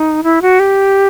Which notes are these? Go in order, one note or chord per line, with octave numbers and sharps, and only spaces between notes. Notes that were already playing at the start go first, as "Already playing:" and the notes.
Already playing: D#4
E4
F#4
G4